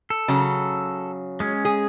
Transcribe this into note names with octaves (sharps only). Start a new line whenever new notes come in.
A4
C#3 F#3
G#3 C#4
G#4